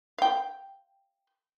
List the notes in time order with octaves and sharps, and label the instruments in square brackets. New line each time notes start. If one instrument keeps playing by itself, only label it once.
[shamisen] F5 G5